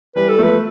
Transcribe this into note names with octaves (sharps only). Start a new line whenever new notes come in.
E3 G3 B4
A4
F3 A3 B4